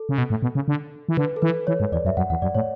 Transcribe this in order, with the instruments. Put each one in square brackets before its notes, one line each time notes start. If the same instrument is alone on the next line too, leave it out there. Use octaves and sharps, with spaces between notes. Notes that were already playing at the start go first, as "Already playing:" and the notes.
Already playing: [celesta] A4
[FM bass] C#3
B2
A2
B2
C#3
D3
E3
[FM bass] D3 [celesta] B4
[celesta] A4
[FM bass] E3 [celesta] B4
[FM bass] E3 [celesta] C#5
[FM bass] G#2
[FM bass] E2 [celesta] D5
[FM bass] F#2 [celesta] E5
[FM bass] F#2 [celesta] F#5
[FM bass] E2 [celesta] F#5
[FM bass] F#2 [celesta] D5
[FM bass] A2 [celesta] C#5